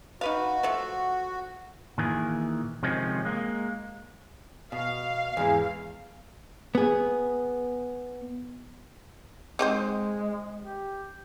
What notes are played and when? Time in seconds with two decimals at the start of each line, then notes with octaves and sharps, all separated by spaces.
0.21 D#4 F#4 B4 F5
0.63 F3 A3
1.98 A#2 D#3 E3 G#4
2.83 C3 D#3 F3 G#3 C4 C#4
3.25 G#3 A#3
4.72 B2 F5
5.37 E2 G#2 E3
6.75 B3 G#4
9.59 G#3 C4 D#4 C5
10.62 G4